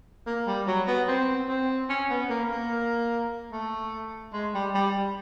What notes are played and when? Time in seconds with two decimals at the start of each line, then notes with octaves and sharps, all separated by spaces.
0.26 A#3
0.46 G3
0.67 F#3
0.87 B3
1.08 C4
1.48 C4
1.89 C#4
2.09 B3
2.29 A#3
2.50 A#3
3.52 A3
4.33 G#3
4.54 G3
4.74 G3